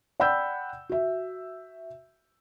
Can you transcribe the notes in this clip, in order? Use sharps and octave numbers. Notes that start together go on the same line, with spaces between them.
D5 F#5 G5 B5 E6 G6
F#4 E5